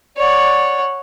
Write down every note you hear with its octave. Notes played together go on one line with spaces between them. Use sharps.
C#5 D5 F#5